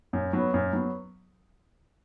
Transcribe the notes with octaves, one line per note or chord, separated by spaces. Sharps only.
F#2
F#3 B3
F#2
F#3 B3